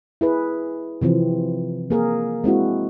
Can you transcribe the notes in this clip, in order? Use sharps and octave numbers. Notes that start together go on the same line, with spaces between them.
E4 G#4 B4
C3 E3 F3 C4
A#3 G#4 A#4
G#3 C4 E4 F#4